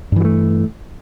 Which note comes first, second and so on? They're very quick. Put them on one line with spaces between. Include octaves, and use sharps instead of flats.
G2 E3 F#3 A3